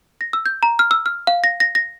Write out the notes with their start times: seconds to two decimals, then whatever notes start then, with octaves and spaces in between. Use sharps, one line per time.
0.21 A#6
0.33 E6
0.46 G6
0.63 A#5
0.79 F6
0.91 E6
1.06 F6
1.27 F5
1.44 A#6
1.60 A#6
1.75 A#6